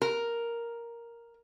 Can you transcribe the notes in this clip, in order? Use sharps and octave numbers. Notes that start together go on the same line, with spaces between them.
A#4